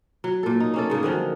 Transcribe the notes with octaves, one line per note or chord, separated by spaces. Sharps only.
F#3
A#2 A4
D#4
A#3 C#4 A4
G#2 C#3 A#3 G#4
D3 D#3 F3 F#3